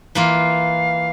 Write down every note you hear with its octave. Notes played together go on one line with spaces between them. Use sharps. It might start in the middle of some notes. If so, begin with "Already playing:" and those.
E3 A#3 F4 F5